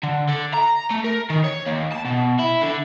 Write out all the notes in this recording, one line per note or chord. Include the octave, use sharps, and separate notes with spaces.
D3
D3
A#5
A3
A#4
D#3
C#5
D#2
A5
B2
E4
D3